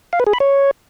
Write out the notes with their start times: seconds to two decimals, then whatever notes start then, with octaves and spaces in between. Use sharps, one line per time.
0.13 F5
0.20 B4
0.27 G#4
0.33 B5
0.40 C#5